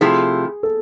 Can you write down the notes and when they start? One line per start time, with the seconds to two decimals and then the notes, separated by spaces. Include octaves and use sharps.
0.01 C3 F3 A3 E4 G#4
0.63 A4